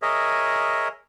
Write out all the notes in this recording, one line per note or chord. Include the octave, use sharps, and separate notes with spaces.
G#4 A#4 C#5 D#5 E5